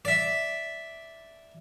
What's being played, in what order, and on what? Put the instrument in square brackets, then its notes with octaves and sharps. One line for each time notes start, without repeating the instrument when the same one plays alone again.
[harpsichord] D5 E5